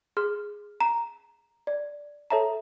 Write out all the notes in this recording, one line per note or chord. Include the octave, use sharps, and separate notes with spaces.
G#4 C6 F6
A#5
D5
A4 C#5 E5 A5 A#5